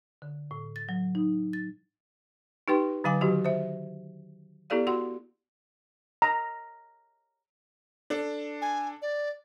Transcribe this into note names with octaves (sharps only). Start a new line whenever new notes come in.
D3
A2
A6
F#3
D#4
A6
D#4 G4 B4 G5 C6
D3 F#3 F5 G#5 D6
D#3 F#3 F#4 G4
C5 E5
B3 E4 G4 A4 D5 F5
F#4 F#5 C6
A#5
D4 A4
G#5
D5